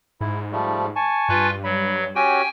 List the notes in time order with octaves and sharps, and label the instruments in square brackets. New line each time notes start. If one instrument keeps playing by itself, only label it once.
[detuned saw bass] G#2 [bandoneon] E4
[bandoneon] F3 G3 A3
G#5 A5 C#6
[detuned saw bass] G2 [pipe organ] F4 B4
[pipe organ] F#3 [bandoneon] B5
[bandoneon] C#4 F#4 G4 [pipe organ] G5 G#5